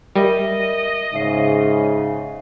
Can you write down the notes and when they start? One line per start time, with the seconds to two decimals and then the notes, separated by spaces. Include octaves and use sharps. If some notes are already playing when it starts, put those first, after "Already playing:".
0.16 G3 A#4 D#5 E5
1.14 G#2 C#3 E5 C7